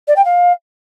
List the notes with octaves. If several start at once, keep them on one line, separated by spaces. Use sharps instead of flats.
D5
G5
F5